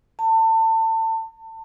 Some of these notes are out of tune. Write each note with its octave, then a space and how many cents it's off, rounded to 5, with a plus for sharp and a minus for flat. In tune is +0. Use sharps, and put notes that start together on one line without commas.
A5 +30